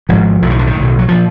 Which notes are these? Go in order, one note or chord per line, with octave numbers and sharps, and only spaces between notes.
G#1 G#2 F3
B1 A2 D#3 F3
D3
D#3
B1 A2
F#3
A#2 F3